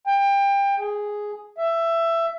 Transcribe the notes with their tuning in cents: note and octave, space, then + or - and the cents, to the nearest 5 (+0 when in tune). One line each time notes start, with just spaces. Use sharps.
G5 +25
G#4 +0
E5 +15